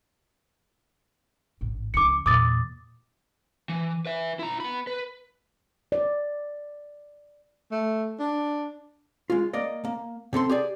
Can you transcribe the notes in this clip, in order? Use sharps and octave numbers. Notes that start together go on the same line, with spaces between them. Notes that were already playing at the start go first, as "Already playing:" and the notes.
A1 G#2
C#2 F3 D6 C#7
E2 A#2 D6 D#6 A6
E3
B4 E5
E4 A#5
B3 B5
B4
D5
A3
D4
G#3 F4
A#3 D5 D#5
A#3
C3 C4 A4 C6
G4 G#4 D5